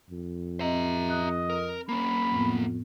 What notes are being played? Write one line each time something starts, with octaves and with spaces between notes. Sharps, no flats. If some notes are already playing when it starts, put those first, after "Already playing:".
F2
C4 D#5 E5 A#5
D#5 F#6
A#4
A#3 C#4 B5
F2 A2 B3